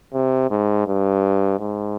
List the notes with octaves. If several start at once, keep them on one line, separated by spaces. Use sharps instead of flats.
C3
G#2
G2
G#2